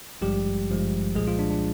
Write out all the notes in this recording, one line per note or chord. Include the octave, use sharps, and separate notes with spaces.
G#1 G2 F3 G3 G#3 G4
G#1 G2 F3 G#3
C2 A#2 F3 G#3 G#4
F3 F4
D4
D4